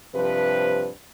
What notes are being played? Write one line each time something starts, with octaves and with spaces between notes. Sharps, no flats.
G2 C3 F3 B4